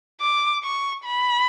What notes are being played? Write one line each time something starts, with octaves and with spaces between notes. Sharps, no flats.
D6
C#6
B5